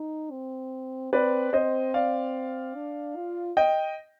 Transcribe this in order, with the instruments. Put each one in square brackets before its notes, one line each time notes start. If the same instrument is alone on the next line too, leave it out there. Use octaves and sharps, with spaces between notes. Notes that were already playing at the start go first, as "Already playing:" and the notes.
Already playing: [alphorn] D#4
C4
[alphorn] C4 [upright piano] B4 D5
[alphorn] C4 [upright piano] C5 D#5
[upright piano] D5 F5
[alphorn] D4
F4
[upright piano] D#5 G5